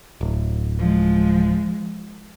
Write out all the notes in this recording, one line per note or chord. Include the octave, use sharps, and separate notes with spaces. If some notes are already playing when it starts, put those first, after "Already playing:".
D1
F3 G#3